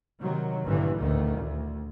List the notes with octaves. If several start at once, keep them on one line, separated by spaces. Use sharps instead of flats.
C3 D#3 F#3
A1 G2 A#2 D3 E3
A1 D2 D#3 A3
D2